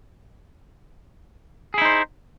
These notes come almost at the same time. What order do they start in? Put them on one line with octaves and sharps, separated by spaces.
G#4 E4 D#4 C5